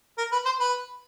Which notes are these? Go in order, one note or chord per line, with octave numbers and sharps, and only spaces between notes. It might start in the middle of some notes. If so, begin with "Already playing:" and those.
A#4
B4
C5
B4